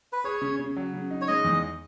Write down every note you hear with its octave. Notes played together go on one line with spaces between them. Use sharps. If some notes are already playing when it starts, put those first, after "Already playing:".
B4
G#4 C#5
C#3
C#3
F#3
C#3
D#4
C#5
G#3 D#5
E2